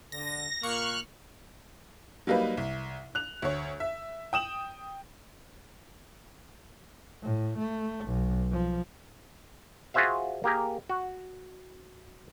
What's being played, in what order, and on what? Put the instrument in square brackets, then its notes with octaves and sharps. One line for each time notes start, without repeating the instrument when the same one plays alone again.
[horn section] D3 [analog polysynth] A#6
[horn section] A#2 A#3 [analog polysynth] C#6 [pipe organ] F6 F#6
[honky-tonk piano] F#3 G3 A#3 D#4 B4
C2
F#6 F7
D2 C#5
E5
G5 D#6 E7 F#7
[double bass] A2
A3
B1
F3
[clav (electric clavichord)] F4 F#4 G#4 C5 E5 F5
A#3 G4 G#4 A#4
F#4